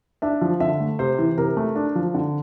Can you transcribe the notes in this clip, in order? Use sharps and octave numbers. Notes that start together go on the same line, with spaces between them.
D4 E5
F3
D3 E5
A3
C3 C5
E3
C3 A#4
A3
D4
F3
D3